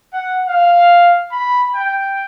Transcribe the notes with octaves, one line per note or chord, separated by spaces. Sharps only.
F#5
F5
B5
G5